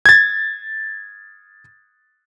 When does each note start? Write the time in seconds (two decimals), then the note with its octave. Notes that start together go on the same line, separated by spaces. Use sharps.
0.06 G#6 A6